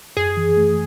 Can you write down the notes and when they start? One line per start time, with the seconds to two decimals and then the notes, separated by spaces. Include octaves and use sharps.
0.17 F#2 G#4
0.37 E3
0.57 A3